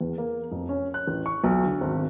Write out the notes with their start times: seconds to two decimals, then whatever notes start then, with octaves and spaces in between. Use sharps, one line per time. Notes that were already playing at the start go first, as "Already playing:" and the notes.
0.01 E2
0.18 A#3
0.51 F1
0.69 C#4
0.94 F#6
1.07 A1
1.26 C#6
1.44 B1
1.65 D3
1.81 G#1